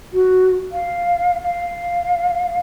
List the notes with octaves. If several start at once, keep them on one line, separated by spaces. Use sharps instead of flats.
F#4
F5
F5